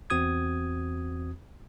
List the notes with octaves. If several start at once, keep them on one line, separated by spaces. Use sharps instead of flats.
E2 C4 F#4 D#6 G#6